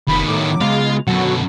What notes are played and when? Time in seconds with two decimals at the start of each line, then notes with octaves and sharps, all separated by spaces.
0.08 F1 D#3 B3 B5
0.28 A2 F#3 D6
0.61 C#3 G#3 B3 F4 F5
1.08 F#2 B2 D3 F#3 F#4 A4 F#5